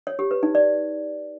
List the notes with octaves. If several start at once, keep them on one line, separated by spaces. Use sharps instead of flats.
C#5
G4
B4
D#4
D5